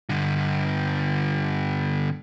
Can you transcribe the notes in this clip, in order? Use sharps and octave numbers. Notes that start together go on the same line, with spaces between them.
G2 D3